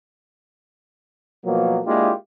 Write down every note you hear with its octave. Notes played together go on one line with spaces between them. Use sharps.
B2 F3 F#3 A#3
G#3 A#3 D4 E4 F4 G4